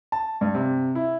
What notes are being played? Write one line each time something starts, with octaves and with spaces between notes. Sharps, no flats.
A5
G2
C3
E4